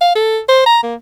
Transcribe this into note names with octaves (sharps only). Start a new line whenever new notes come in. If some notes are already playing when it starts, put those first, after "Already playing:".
F5
A4
C5
A#5
A#3